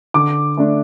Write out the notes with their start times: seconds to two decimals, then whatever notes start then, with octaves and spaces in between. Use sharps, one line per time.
0.14 D3 D6
0.57 A3 D4